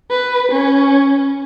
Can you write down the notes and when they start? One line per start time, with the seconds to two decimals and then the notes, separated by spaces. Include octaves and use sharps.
0.10 B4
0.52 C#4